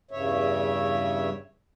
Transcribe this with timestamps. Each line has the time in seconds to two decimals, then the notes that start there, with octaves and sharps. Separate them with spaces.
0.11 E2 G2 C#3 C#5 E5